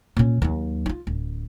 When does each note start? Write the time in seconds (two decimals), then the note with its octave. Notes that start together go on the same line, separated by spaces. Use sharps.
0.17 A#2 C#4
0.42 D#2 F#3
0.86 D#4 F4
1.07 D1